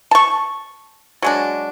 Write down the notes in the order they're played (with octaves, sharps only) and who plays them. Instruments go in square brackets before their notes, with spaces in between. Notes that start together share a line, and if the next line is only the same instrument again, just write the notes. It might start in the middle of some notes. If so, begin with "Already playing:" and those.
[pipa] A5 C#6
F#3 G#3 D4